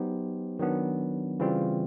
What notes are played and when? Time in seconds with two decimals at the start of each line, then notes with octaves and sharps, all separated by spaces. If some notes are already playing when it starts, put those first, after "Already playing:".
Already playing: F#3 B3 D#4 G4 C5
0.59 D#3 F#3 B3 D4
1.39 C#3 E3 G3 C4 F4